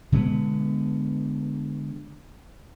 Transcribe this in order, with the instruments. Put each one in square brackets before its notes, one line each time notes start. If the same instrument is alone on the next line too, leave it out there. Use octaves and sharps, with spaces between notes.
[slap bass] B2 D3 G#3 B3